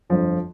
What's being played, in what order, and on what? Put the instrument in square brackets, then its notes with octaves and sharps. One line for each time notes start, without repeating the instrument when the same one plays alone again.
[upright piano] G1 F2 D3 F3